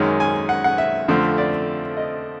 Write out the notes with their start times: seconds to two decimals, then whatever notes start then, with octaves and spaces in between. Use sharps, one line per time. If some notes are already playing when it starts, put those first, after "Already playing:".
Already playing: F#2 D#3 G#3 C#4
0.20 G#5
0.49 F#5
0.64 F#5
0.78 E5
1.08 F2 D3 F3 A3 C4
1.38 D5
1.97 D#5